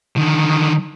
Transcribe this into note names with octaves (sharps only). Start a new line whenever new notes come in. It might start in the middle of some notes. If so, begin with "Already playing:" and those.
D3 D#3